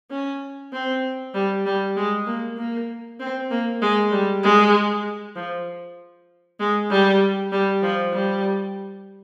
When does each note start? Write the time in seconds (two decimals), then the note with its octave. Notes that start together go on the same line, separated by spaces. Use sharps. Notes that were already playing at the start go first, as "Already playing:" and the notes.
0.11 C#4
0.73 C4
1.34 G3
1.66 G3
1.97 G#3
2.27 A#3
2.58 A#3
3.20 C4
3.51 A#3
3.82 G#3
4.12 G3
4.44 G#3
5.36 F3
6.60 G#3
6.91 G3
7.52 G3
7.83 F3
8.14 G3